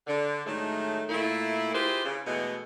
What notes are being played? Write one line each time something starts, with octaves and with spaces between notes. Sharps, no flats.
D3
A2 D#3 F#3 G#3 A3
A#2 A3 A#3 E4
E4 F4 G4 G#4 B4 C5
C#3
B2 E3 G#3 A3 B3